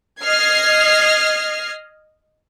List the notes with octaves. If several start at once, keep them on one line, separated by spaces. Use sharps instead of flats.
D#5 F6 G#6 C7